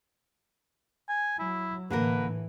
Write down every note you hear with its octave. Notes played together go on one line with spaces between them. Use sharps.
G#5
F#3 E4
A2 D3 E3 A#3 A#4 B4